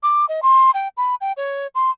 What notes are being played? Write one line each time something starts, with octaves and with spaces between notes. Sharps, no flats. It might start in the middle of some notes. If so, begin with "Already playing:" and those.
D6
D#5
C6
G5
B5
G5
C#5
C6